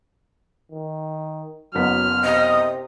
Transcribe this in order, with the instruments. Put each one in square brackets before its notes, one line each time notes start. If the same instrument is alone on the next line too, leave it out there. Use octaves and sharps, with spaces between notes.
[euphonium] D#3
[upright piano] F#1 B3 B6 [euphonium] F#3 [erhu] F6
[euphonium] C3 [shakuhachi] D#5